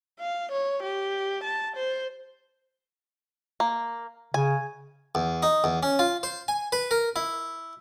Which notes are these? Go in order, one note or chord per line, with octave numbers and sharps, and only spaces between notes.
F5
C#5
G4
A5
C5
A#3
C#3 G#5
E2
D#4
E2
C#4
F4
C5
G#5
B4
A#4
E4